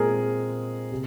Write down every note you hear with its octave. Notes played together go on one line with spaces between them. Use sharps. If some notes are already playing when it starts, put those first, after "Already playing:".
Already playing: A#2 G#3 C4 G#4 A#4
C3